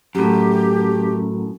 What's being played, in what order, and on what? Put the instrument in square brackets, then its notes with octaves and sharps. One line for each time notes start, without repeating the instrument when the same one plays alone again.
[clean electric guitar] F#2 A2 [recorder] G4